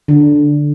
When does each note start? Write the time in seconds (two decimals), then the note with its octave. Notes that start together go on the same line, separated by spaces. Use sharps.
0.08 D3